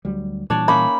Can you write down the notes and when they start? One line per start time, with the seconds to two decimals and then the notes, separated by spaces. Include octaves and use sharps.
0.05 D2 F#3 G3
0.50 A#2 E3 G3 D4 C#5 D5
0.68 A#3 C#4 D#4 B5